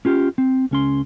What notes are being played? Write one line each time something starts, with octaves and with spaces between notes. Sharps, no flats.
C#4 F4 G4
C4
C#2 C#4 C6